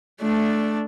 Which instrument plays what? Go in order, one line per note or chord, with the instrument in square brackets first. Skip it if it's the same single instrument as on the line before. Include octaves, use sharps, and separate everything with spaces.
[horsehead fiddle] A3 D4